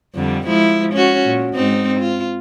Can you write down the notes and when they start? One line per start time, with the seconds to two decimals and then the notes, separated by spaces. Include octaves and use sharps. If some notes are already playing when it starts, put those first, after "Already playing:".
0.14 F2 D3 G3
0.47 F3 G#3 E4
0.93 C#4 F#4
1.25 A#2
1.54 G#2 C4 D#4
2.00 F4